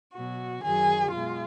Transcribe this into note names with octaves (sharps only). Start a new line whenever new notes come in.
B2 F#3 F#4
F#2 D#3 F#3 G#4
B2 G#3 F4